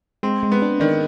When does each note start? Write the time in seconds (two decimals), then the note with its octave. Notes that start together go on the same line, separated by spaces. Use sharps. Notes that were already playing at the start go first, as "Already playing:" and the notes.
0.23 G#3 C4
0.43 G#3
0.52 B3
0.62 D4
0.80 D#3 D4